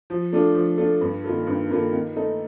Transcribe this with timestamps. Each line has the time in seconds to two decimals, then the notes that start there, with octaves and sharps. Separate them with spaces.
0.10 F3
0.32 A3 D4 F4 A4
0.55 F3
0.78 A3 D4 F4 A4
1.01 G2
1.24 D#3 A#3 F4 A4
1.47 G2
1.70 D#3 A#3 F4 A4
1.93 D#3
2.16 A3 D#4 A4